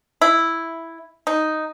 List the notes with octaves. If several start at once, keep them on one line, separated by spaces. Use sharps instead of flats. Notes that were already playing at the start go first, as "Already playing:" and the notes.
E4
D#4